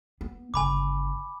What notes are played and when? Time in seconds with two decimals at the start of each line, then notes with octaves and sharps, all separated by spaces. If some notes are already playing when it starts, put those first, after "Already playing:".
0.21 B3
0.54 G1 C#3 G#5 B5 D6